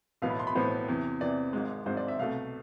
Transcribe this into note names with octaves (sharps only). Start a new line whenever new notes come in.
B1 A2 E3 B3 F5
B5
C6
B5
B1 A2 E3 B3 C5
E2 C3 E3
E2 C3 E3 D5
G#1 G#2 G#3
G#1 G#2 G#3 C5
D5
E5
C2 B2 A3 F5